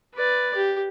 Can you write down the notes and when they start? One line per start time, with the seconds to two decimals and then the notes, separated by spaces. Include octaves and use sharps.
0.14 B4 D5
0.56 G4